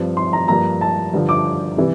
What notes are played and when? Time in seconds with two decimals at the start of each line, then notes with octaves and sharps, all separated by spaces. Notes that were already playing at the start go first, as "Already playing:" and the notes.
Already playing: G2 F3 C4
0.17 C6
0.33 A#5
0.48 G2 F3 A#3 A#5
0.81 A5
1.13 G2 D3 F3
1.29 D6
1.77 C3 E3 G3